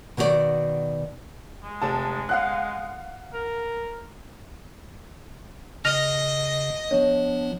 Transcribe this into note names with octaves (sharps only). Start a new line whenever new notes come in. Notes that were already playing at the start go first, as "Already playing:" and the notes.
B2 D#3 F#4 G4 D5
G#3
F1 A5
F5 F#5 F#6
A#4
C#3 D#5 F6 A#6 F7
F3 B3 D4 C#5